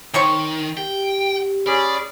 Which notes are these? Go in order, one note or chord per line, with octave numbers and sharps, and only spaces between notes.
D#3 C4 C#5 C#6
G4 G5
C#4 G#4 D5 B5